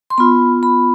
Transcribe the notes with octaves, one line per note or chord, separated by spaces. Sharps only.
C6
B3 F4 B5
B5